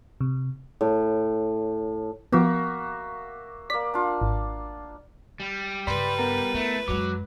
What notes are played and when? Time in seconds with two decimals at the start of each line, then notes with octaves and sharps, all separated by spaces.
0.21 C3
0.81 A2
2.32 F3 A#3 B3 F#4 E5
3.70 A#3 D5 B6
3.94 D4 F4
4.21 G#1
5.40 G3
5.87 G2 C#3 B4 D5 B5 C6
6.18 B3 A#4 A#5
6.55 A3 E4
6.88 F#2 F#3 G#3 D6